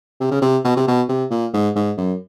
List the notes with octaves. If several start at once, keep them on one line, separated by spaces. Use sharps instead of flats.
C3
C#3
C3
B2
C3
B2
C3
A#2
G#2
G#2
F#2